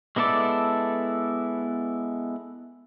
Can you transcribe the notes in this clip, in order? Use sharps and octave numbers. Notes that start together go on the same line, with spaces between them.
G#3 B3 E4 A4 D5